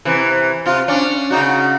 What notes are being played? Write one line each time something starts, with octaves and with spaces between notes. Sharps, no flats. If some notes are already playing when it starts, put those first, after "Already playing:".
C3 E3
C3 F4
C#4 D4
C#3 D#4 F#4